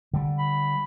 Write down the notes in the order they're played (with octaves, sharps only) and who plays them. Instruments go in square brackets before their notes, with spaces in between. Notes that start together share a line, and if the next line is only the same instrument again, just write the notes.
[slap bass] D3 G3
[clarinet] B5